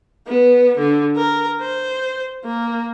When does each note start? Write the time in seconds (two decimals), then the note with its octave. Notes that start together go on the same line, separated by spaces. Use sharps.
0.27 B3
0.77 D3
1.16 A#4
1.60 C5
2.45 A#3